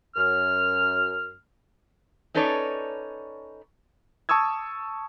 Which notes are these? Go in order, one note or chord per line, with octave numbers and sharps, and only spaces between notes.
F#2 F6
C#4 D#4 A4 B4 C#5 D5
A5 C#6 D#6 E6 G#6